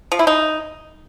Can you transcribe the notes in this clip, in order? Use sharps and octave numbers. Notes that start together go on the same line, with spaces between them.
F3
E4
D#4